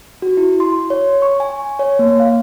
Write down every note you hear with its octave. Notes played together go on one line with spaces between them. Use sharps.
F#4
E4
C6
C#5
C#6
G#5
C#5
A#3
F5